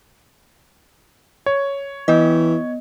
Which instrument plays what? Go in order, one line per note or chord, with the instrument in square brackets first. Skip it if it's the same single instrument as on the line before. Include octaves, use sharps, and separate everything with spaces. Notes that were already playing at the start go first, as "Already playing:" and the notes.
[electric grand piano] C#5
[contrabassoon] E3 [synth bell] B3 D#5